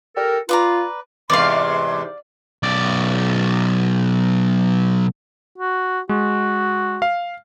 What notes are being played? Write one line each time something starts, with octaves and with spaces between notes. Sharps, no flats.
G4 A4 A#4
F4 B4 D5 A#5
E2 G#2 C3 D5 F5 C6
B1 D5
F#4
G#3 F#4
F5